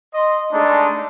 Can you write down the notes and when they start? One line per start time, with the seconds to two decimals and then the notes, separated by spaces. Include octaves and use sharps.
0.14 D#5 C6
0.53 G#3 A3 D4 D#4 G#4 A5